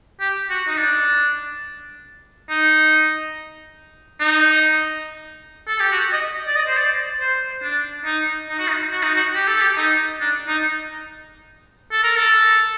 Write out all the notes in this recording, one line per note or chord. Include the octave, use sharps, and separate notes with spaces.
G4
F#4
D#4
D4
D#4
D#4
A4
G4
F#4
D#5
D5
D#5
C5
D5
C5
D4
D#4
D#4
F#4
D#4
F#4
D#4
F#4
G4
A4
G4
D#4
D4
D#4
A4
A#4
A4